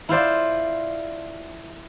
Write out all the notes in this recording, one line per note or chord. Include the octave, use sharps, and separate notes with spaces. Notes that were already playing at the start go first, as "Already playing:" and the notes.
E4 F4 C5 D5